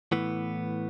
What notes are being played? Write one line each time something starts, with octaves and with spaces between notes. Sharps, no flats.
A2 E3 B3